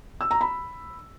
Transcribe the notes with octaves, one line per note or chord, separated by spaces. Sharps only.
E6
A#5
B5